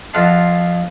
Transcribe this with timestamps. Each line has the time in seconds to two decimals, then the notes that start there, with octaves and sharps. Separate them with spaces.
0.13 F2 F4 F5 F#5 A5 C6